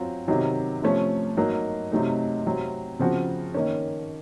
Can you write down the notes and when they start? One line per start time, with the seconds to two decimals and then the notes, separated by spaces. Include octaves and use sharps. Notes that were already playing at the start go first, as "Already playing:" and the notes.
Already playing: F#3 C4 F4
0.28 C3 D#3 F#3
0.82 C3 F3 A3 C#4
1.37 F#3 A#3 D#4
1.92 C3 F#3 A3 D#4
2.46 C3 F#3 C4
2.99 C#3 F3 C4 F#4
3.54 D#3 A#3 C#4